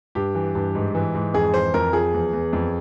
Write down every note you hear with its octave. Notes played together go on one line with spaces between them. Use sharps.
G2 G4
E3
G2
G#2
E3
G#2
F2 G#4
E3 C5
F2 A#4
F3 G#4
E2
E2
F2